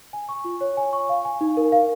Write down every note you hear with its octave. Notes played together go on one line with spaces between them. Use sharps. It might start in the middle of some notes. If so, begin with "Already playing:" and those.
G#5
C#6
F4
C#5
G#5
C#6
F5
G#5
D#4
A#4
F5